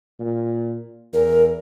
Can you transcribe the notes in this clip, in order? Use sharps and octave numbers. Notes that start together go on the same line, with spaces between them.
A#2
E2 A#4